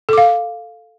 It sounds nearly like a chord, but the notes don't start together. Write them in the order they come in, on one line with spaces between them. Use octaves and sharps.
A4 D6 F5